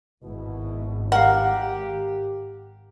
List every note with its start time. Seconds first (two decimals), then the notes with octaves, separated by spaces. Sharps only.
0.23 G#1 B2 E4
1.12 G4 A#4 F5 F#5